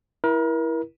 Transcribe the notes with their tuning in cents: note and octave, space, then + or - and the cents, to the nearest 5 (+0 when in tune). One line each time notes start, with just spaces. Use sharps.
E4 +0 A#4 +35